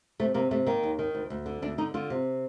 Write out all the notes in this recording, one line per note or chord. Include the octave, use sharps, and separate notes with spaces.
C3 A3
C3 A#3
C3 A3
D#3 A#3
D#2
D#3
D2
D2
D3
D2 D4
D3 D#4
D3 F4
C3